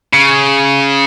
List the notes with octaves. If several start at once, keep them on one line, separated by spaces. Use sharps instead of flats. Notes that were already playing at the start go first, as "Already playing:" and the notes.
C#3